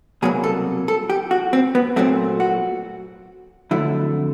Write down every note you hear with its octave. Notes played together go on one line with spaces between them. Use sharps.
C2 B2 F#3 A#3 G#4
A4
A4
G4
F#4
C4
B3
A#2 F#3 A3 C4
F#4
F2 D3 F#3 A3 E4